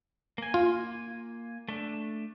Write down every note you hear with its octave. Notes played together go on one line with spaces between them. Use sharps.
A#3 G#5
F4
A3 D4